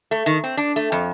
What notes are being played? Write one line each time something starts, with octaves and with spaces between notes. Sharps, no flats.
A3
D#3
C4
D4
A3
F2